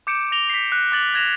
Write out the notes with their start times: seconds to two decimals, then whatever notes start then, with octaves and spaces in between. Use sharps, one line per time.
0.07 D6 G6 C#7 D7 E7
0.31 D6 A#6 F7 G7
0.50 B6 C7
0.72 F#6
0.92 D6 A6 F#7
1.14 F#6 G#6 A#6 E7 F7